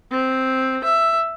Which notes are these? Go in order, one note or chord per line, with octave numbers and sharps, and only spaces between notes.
C4
E5